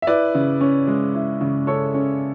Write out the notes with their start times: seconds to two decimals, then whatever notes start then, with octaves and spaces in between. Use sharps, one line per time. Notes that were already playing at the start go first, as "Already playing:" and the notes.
0.02 E5
0.07 E4 B4 D5
0.35 C#3
0.61 C#4
0.87 G#3
1.15 E4
1.41 C#3
1.67 C#4 A4 C#5
1.94 C#4